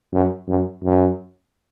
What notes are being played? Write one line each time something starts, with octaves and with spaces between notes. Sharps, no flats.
F#2
F#2
F#2